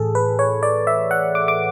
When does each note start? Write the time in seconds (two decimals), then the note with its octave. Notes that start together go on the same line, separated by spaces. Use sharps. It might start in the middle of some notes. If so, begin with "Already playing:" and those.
Already playing: A2 E3 G#4 A4
0.15 B4
0.39 C#5
0.63 D5
0.87 E5
1.11 F#5
1.35 D6
1.48 D6